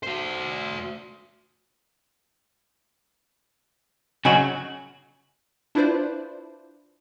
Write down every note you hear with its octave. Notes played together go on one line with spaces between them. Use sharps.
F#4 C5
C#3 F#3 F#4 D#5 G#5
D4 E4 F4 B4 C5 D5